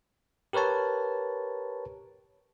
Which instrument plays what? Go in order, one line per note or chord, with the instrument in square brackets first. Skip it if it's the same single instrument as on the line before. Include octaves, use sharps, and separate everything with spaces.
[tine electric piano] G4 A#4 B4 C#5 A5